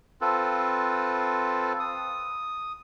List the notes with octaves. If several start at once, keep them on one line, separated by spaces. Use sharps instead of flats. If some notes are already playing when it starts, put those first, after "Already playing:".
C4 F4 A4 B4
D#6